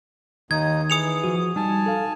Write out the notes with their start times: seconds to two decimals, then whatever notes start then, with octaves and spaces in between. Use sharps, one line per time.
0.51 D#2 D#3 D#4 D#6 G#6
0.90 E3 G#4 D#6 C#7 F7
1.24 F3 F#4
1.56 G3 D#4 G#5 A5
1.86 A4 F5